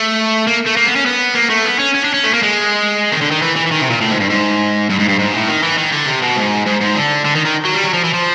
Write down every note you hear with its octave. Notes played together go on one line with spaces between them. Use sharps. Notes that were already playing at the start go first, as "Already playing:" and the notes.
Already playing: A3
A#3
A3
A#3
B3
C#4
B3
A#3
A3
B3
C#4
C#4
D4
C#4
A3
A#3
G#3
D#3
D3
D#3
E3
E3
E3
D#3
C3
A#2
A2
G#2
G2
G#2
G2
G#2
G2
G#2
A2
D#3
E3
D#3
D3
C3
B2
G#2
G#2
G#2
D3
D3
D#3
D#3
F#3
G3
F#3
F3
E3
F3